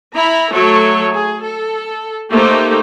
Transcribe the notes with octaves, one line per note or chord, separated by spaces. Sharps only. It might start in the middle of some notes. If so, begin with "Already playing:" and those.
E4 A#5 B5
F#3 A3 A4 C#5
G#4
A4
A3 A#3 D#4 G4 C5